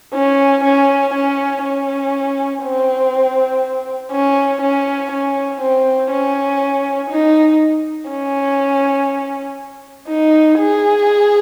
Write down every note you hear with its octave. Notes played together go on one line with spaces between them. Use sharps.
C#4
C#4
C#4
C#4
C4
C#4
C#4
C#4
C4
C#4
D#4
C#4
D#4
G#4